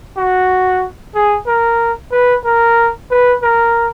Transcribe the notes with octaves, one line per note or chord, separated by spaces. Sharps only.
F#4
G#4
A#4
B4
A#4
B4
A#4